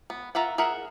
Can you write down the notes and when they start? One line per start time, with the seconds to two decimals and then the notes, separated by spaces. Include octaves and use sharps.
0.10 B3
0.35 F4 A#4 E5 F#5
0.58 G#4 A#4 E5 F#5